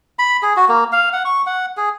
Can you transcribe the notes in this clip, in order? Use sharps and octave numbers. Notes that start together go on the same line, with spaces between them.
B5
G#4
F#4
A#3
F5
F#5
C#6
F#5
G#4